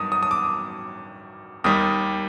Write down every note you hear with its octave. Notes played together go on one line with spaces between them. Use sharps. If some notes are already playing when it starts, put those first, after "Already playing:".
Already playing: G2 D#3 F#3 D#6
D#6
D#6
D6
D#2 D#3 G3 D#6